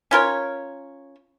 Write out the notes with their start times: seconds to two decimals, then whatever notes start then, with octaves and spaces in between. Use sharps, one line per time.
0.11 C#4 F4 A#4 C#5